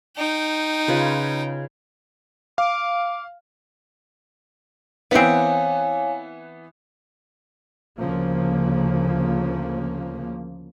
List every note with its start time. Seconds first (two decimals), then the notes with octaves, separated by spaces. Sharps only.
0.17 D#4 G5
0.88 C#3 F4 B4
2.58 F5 D6
5.11 E3 B3 C4 B4 C#5 F5 G#5
7.99 D2 C#3 F3 A#3